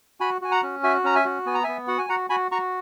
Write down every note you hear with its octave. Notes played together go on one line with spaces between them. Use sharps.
F#4 G#5 B5
F#4 G#5
F#5 A#5
C#4
F#4 E5 G#5
C#4 A#5
E5 G#5
F#4
B3 G#5
A#5
B3 E5 G#5
F#4 F#5
G#5
F#4 F#5 A#5
F#4 G#5 B5
F#4 A#5 C#6